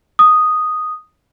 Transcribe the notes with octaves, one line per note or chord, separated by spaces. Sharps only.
D#6